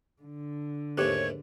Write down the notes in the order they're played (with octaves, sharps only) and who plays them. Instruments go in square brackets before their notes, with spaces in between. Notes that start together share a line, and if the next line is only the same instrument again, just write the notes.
[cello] D3
[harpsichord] D#2 G#2 A3 [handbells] G4 B4 [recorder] C#5